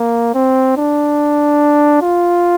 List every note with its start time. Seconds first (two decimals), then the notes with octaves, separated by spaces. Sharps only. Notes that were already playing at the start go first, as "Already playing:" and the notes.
Already playing: A#3
0.34 C4
0.77 D4
2.02 F4